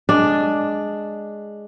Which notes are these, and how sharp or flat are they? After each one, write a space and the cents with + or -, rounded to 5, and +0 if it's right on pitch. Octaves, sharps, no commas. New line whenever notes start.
G#3 +0 D4 +0